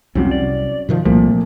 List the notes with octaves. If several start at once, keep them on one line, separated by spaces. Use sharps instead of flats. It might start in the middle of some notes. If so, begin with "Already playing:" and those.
C2 F2 C3 F#3 C#4
D5
B2 D#3 F3
C2 A#2 F3 A3 A#3